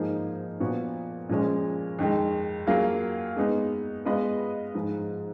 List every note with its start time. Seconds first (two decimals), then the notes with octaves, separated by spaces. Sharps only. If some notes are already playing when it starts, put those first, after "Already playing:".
Already playing: G#2 F3 A#3 D#4 G#4
0.60 A#2 F3 B3 F#4
1.29 A#2 F3 G#3 C#4
1.99 F2 D#3 G#3
2.67 F#3 A#3 F4 G#4
3.37 G#3 B3 D#4
4.05 G#3 B3 F4 B4 D#5
4.74 G#2 F3 G#3